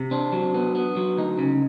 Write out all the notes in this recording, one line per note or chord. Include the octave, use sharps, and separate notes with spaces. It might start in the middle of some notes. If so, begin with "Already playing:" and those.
Already playing: C3
C4 D4
F#3
B3
B3
F#3
D2 D#4
C#3